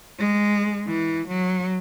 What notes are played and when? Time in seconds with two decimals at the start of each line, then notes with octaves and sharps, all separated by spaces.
0.19 G#3
0.87 E3
1.28 F#3